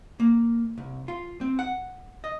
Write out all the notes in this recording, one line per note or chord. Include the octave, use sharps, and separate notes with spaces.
A#3
C2
F4
C4
F#5
D#5